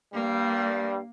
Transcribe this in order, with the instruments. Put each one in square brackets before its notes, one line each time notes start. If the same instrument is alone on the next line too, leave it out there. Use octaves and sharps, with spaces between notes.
[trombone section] G2 G3 [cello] A#3